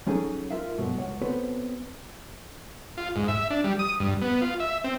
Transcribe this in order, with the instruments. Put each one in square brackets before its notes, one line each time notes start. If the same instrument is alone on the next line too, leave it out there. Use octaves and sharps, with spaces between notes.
[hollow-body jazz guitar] F#3 C#4 D#4 G#4 A4 A5
F4 A#4 E5 F5
G2 B2 F#3 A3
C#2 C#5 F#5
B3 C4 F#4 A4 B4 C#5
[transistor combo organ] F4
G#2
E5
D4
G3
D#6
G2
B3
F4
E5
C4